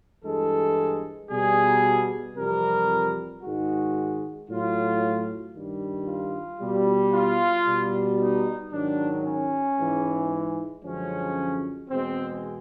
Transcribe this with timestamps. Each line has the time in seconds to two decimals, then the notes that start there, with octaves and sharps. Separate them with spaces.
0.25 G2 E3 G#3 A4
1.30 B2 G3 G#4
2.36 F2 C3 E3 G3 A#4
3.43 G#2 D#3 G#3 F#4
4.49 A2 F#3 F4
5.54 G2 D#3 G3
6.07 F4
6.61 B2 G3
7.14 F4
7.66 B2 G3
8.20 D#4
8.73 G#2 D#3 F#3 D4
9.26 C#4
9.78 G#2 E3 G#3
10.84 F#2 D3 F3 G#3 C#4
11.90 E2 B2 G#3 C4